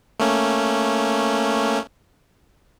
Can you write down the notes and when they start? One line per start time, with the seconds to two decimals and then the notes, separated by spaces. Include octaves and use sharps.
0.20 A3 A#3 C#4